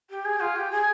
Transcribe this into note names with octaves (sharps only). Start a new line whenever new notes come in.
G4
G#4
F4
G4
G#4